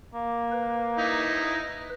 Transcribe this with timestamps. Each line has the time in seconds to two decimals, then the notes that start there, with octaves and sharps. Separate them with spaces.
0.14 A#3
0.52 B4
0.98 D#4 E4